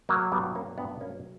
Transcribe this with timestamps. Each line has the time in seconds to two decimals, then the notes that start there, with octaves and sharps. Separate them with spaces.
0.09 F#3 A#3
0.32 G2 G3 B3
0.55 F#3 A#3 C#4
0.78 G2 B3 D4
1.01 F#3 A#3 C#4